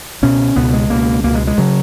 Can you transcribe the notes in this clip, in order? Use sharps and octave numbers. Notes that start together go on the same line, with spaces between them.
C#2 B2 C#4
C#2 B2 B3
G#3
C#2 B2 A#3
C#2 B2 A#3
G#3
G#3
C#3 F#3